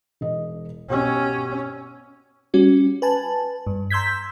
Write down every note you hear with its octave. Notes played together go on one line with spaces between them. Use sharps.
E1 D#5
B2 C#4 G4 E6
G3 C#4 F#4
B4 G#5 A5
G2
A#5 C6 E6 G6 G#6 B6